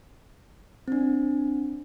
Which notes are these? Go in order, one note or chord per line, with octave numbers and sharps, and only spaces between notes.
C4 D4